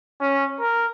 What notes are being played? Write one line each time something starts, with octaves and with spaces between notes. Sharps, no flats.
C#4
A#4